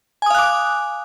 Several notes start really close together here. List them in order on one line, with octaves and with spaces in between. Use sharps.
G#5 D#6 F5 F#6 D6